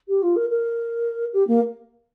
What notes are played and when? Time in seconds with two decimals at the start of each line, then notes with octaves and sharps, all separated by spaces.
0.08 G4
0.22 F4
0.36 A#4
0.49 A#4
1.33 G4
1.47 A#3